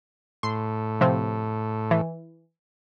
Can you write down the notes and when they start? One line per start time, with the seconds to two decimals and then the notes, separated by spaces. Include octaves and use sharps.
0.43 A2 C6
1.01 C3 F3 C4
1.91 E3